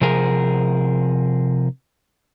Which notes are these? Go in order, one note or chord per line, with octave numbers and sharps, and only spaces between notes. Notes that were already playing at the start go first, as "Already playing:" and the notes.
C3 F3 G#4 A#4